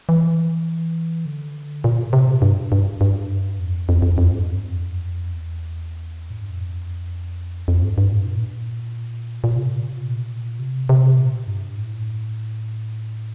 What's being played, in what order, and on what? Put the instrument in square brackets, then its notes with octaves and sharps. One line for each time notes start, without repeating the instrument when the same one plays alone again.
[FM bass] E3
D3
A#2
C3
A#2
G2
G2
G2
F2
F2
E2
F2
F2
G2
F2
G2
F2
E2
A2
G2
F2
F2
G2
G2
A2
A#2
A#2
C3
A#2
C3
A#2
C3
C3
A#2
G2
A2